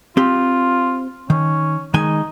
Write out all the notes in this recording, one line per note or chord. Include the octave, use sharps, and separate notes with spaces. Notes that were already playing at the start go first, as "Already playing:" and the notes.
C4 F4 G4
D#3 C#4
D#3 G#3 D#4 G#5